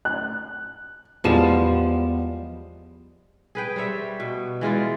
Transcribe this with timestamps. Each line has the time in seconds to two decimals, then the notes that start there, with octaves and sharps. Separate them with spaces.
0.05 F#6
1.24 E2 F3 G3 G#3 B3 E7
3.55 G#4 B4 G5
3.76 G3 C5 C#5 E5
4.20 B2
4.61 E3 G#3 F4 D5